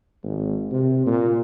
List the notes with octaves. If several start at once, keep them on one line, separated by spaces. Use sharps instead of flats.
G#1
C3
A#2